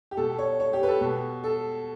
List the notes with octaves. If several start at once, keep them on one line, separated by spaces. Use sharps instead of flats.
G4
B2 A4
C#5
C#5
G4
B4
A4
B2
A4